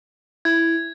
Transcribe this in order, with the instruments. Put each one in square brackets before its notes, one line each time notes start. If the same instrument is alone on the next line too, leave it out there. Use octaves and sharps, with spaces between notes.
[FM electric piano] E4 [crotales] G#6